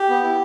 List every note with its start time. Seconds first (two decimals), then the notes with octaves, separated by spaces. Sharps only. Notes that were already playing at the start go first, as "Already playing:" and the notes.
Already playing: G4
0.09 B3
0.23 E4